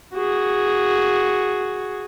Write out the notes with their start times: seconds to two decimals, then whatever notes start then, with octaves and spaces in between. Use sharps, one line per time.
0.15 F#4 G#4